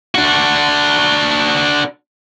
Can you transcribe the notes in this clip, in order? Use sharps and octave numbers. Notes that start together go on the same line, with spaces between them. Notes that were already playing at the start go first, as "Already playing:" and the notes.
D4 F#4